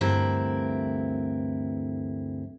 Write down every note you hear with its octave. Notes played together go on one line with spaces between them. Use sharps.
D2 G2 E3 C4 E4 A#4